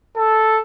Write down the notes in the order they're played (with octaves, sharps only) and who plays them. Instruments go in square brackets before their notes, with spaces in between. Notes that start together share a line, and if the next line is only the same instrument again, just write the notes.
[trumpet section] A4